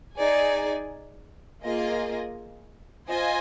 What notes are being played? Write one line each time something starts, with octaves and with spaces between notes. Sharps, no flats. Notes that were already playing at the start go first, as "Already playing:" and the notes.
D#4 G#4 D5 G#5
A#3 F4 G#4 D#5
F4 C5 D#5 G#5